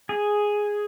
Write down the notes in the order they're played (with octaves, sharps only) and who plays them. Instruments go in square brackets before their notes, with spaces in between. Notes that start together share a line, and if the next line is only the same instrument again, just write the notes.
[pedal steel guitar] G#4